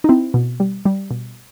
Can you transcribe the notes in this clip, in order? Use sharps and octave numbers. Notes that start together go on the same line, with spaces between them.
D#4
C4 E4
B2
G3
G3
B2